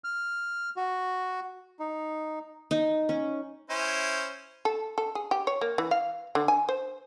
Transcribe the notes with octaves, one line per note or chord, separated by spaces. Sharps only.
F6
F#4
D#4
D#4
C#4
C#4 E4 C5
A4
A4
G#4
G4
C#5
A#3
E3
F5
D3
G#5
C5